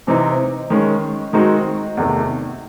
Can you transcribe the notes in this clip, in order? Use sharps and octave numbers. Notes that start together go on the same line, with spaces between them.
C3 E3 C4 D#4
D#3 G#3 C#4
D#3 G#3 C4 D#4 F#4
E2 C3 D#3 A3